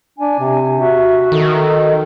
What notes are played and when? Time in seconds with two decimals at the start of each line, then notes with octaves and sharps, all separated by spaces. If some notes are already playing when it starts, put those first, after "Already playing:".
0.19 D4 G#5
0.39 C3
0.79 F#4 E5
1.32 D#3 A4